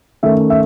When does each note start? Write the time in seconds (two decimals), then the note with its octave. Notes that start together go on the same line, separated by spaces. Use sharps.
0.23 D#3 A3 C#4 E5
0.50 E5